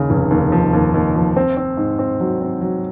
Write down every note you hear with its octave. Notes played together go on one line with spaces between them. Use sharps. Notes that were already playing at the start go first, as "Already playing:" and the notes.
Already playing: D#2 C#3
F1
D#2
F3
D#2
D#2
F3
C4
C4
G#2
C4
F#3
C4
F#3